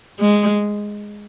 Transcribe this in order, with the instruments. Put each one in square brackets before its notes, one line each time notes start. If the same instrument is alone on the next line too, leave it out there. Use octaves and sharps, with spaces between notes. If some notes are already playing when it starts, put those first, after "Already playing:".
[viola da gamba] G#3